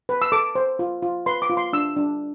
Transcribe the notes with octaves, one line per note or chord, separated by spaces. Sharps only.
B4
E6
A4 D6
C5
F4
F4
B4 C6
D6
F4
C6
D4 E6
D4